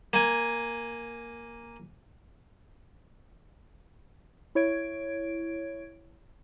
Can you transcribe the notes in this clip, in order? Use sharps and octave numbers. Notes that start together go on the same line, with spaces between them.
A#3 G#5
E4 C#5 G#6 D7